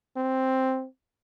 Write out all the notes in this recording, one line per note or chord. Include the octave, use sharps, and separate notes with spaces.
C4